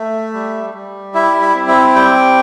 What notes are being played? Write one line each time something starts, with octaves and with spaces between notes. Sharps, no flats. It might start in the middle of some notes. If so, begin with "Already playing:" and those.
Already playing: A3 E5
G3
G3
E4 E5
E5
C4
E5
G3 G5